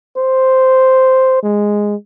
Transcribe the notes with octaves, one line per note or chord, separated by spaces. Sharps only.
C5
G#3